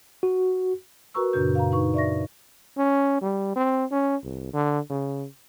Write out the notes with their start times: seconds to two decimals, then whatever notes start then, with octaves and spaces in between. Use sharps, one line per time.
0.23 F#4
1.14 F#4 A#4 B4 A#5 C#6 E6
1.33 F#2 A#2 C#3 D4 F#4 G6
1.55 F5 A#5
1.72 D#4 F#4 B4 C#6
1.94 D5 E5 C#6 A#6
2.77 C#4
3.22 G3
3.56 C4
3.92 C#4
4.23 C2
4.54 D3
4.90 C#3